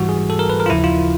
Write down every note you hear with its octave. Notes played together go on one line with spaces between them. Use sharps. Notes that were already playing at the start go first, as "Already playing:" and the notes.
Already playing: G#2 E3 G3 F#4
G#4
A4
A#4
B4
A#4
F4
D#2 C#3 F3 E4
F4